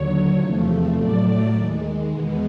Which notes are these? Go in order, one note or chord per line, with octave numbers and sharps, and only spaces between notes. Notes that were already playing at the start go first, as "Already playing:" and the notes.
Already playing: D#2 D3 F#3 C#5
E2 C3 F3 A3
A2 F#3 A3 D5
D#2 D#3 G#3
E2 B2 G#3 B3